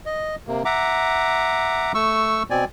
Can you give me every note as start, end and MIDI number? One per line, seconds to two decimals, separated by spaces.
0.06 0.36 75
0.47 0.63 48
0.47 0.63 58
0.65 1.92 76
0.65 1.92 78
0.65 1.92 82
0.65 1.92 86
1.94 2.43 57
1.94 2.43 85
1.94 2.43 88
2.50 2.65 47
2.50 2.65 60
2.50 2.65 74
2.50 2.65 80